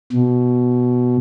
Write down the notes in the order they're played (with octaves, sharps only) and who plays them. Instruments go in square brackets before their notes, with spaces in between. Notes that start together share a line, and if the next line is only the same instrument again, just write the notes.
[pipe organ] B2